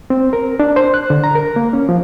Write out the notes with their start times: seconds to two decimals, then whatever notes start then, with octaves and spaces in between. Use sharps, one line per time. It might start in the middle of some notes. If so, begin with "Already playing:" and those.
0.10 C4
0.33 A#4
0.60 D4
0.76 C5
0.94 F#6
1.10 D3
1.24 A#5
1.35 A#4
1.56 A#3
1.73 C#4
1.89 F3